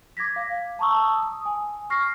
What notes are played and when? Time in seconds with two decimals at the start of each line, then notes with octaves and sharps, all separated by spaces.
0.17 D6 G#6 A#6 B6
0.36 F5
0.79 A5 A#5 C#6 D#6 E6
1.23 D#6
1.45 G#5
1.90 C#6 F6 A#6 C7